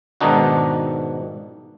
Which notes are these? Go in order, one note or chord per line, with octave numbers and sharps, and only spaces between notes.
G#2 B2 D#3 D4 D#4 F#4